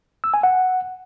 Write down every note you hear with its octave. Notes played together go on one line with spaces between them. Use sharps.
E6
G#5
F#5